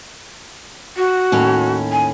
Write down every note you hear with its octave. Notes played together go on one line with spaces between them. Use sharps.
F#4
D#2 A2 C#4
G#5